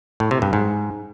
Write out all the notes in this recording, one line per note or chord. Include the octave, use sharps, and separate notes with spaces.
A2
C3
G2
G#2